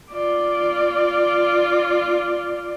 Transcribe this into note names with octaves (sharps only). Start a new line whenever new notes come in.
F4 D5